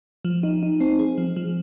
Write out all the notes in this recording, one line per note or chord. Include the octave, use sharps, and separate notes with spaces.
F3
D#4
D#4
C4
G#4
F3
F3